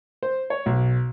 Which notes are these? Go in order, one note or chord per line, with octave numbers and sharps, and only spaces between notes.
C5
C#5
B1